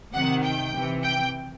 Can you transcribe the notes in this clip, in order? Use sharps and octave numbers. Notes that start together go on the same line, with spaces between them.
C3 D#3 F#5
G5
C3 E3
G5